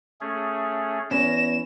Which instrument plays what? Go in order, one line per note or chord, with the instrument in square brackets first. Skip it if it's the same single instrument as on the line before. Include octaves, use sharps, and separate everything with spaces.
[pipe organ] A3 C#4 G#4
[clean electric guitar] E2 [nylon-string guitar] C#4 [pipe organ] A#6 [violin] E7